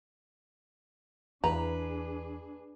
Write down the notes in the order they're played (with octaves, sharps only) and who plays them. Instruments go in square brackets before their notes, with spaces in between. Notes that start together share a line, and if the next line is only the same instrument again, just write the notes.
[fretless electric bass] E2 [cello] D4 G#4 [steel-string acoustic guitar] B4 [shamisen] A#5